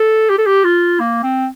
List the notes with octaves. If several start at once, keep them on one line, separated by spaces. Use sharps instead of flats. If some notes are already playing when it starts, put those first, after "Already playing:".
Already playing: A4
G4
A4
G4
F4
A#3
C4